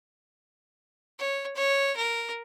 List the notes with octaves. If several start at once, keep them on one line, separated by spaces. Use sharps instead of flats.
C#5
C#5
A#4